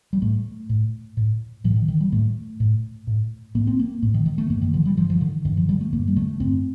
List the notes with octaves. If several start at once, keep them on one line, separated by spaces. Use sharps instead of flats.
G3
A2 A3
A2
A2
A2 F3
D3
D#3
D#3
G3
A2 A3
A2
A2
A2 A#3
C4
A#3
A2 A3
D#3
D#3
A3
G2 A#3
D#3
D3 F3
G3
G2 F3
F3
D3 D#3
G2 D#3
F3
D3 G3
A3
G2 A#3
G3
D3 A3
G2 C4